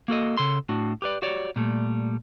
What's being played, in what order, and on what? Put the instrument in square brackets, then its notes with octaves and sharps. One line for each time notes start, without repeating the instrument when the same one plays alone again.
[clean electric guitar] A#3 F#4 A4 D#5
C#3 A4 C6
A2 D4 F#4
G4 B4 D5
F#4 G4 C#5 D5
A#2 G3 A3